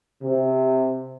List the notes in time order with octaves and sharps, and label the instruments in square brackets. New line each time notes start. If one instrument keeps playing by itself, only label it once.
[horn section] C3